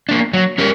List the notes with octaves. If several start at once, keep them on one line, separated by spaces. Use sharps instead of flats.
A#3 D4
F#3
C#4 G4 A#4